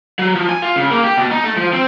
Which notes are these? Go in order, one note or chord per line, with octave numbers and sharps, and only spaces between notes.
F#3
F3
G#5
F4
C#3
A#3
G4
B2
D#4
A3
F3
C4